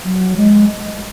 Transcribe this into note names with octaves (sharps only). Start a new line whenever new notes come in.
F#3
G#3